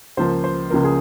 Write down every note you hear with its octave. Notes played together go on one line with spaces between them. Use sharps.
C#2 C#3 F3 A#3 C5
C5
C#2 C#3 F3 A#3 A#4
G#4